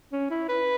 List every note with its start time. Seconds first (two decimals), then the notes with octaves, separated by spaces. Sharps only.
0.12 C#4
0.30 E4
0.49 B4